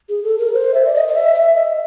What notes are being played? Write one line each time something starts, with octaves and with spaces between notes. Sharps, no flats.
G#4
A4
A#4
C5
E5
D5
D#5
D#5
E5
E5
D#5